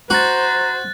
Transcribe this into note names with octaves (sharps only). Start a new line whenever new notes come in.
F#4 C5 A#5 F#6 A6